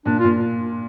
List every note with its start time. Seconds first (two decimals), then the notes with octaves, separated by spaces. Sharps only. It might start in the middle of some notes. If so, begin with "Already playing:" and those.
0.05 A#2 D4
0.19 F4
0.24 A#2